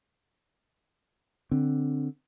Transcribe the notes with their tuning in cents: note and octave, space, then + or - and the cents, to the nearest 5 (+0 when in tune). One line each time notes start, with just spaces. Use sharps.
D3 +0 C4 +0